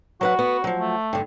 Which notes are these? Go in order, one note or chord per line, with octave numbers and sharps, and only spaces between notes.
F#3 F#4 B4 F#5
B3
F3 F#3
A3
G2 D3